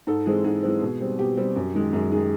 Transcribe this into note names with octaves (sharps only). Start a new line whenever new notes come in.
G#2 A4
E3 G#3 C4 G#4
G#2 G#4
E3 G#3 C4
B2
G3 C4
B2 G4
G3 C4
F#2
D#3 G#3
F#2 G#4
D#3 G#3 G#4